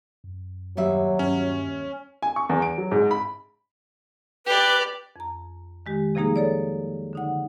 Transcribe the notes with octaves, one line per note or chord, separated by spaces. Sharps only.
F#2
D#2 F#3 G3 E5
G2 C#4
G#5
C#6
E2
D7
F#3
G#2
B5
G4 B4 D5
F2 A#5
D#3 G#3 G4
C3 F3 G3 A#3 D#4 G#4
A4 C#5 D5
D3 D#4 F#5